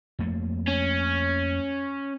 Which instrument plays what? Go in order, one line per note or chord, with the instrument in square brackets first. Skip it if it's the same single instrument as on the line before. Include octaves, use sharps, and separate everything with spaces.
[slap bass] F2 A3 A#3
[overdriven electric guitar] C#4